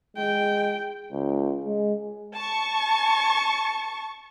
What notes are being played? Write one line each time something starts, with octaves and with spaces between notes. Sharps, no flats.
G#3 G5
C#2
G#3
A5 C#6